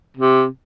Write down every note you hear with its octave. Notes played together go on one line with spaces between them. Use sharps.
C3